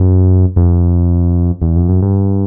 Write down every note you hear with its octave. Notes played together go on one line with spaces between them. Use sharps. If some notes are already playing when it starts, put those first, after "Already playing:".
Already playing: F#2
F2
E2
F2
F#2
G2